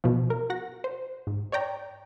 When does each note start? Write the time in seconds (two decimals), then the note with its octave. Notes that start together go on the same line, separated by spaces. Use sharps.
0.04 B2 F3
0.30 A#4
0.50 F#4 F#5 A#6
0.84 C5
1.27 G#2
1.52 C#5 D5 G5 A#5